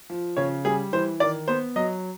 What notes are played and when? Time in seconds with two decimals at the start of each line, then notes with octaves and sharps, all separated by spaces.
0.10 F3
0.37 C#3 C#5
0.65 G3 G#4
0.93 E3 C5
1.20 D#3 D5
1.48 B3 C5
1.76 F#3 D#5